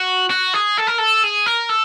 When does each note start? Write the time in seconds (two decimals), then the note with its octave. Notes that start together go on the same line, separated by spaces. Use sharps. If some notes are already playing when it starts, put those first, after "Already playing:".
Already playing: F#4
0.30 F#4
0.54 G#4
0.77 A4
0.87 A#4
0.98 A4
1.23 G#4
1.46 A#4
1.70 A4